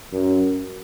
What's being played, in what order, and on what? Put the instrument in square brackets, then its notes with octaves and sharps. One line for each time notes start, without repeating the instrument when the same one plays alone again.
[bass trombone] F#2